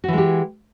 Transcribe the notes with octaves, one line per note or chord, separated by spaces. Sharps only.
E3 G#3 F#4 G4